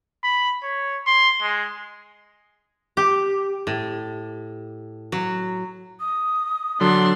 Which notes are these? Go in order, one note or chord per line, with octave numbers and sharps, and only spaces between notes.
B5
C#5
C6
G#3
G4
A2
F#3
D#6
D3 F#3 D4 C6